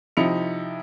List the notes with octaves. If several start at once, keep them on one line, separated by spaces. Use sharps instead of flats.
C3 F3 D#4 E4 C#7 F7